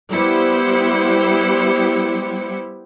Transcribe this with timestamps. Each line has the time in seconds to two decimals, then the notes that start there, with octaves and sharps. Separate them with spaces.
0.12 G3 B3 E4 G4 C5 C#7